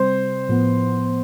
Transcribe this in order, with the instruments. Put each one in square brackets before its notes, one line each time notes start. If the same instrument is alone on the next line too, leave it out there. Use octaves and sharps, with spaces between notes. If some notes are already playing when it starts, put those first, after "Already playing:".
Already playing: [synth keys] C3 G3 C4 [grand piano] C5
[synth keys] A2 F3 B3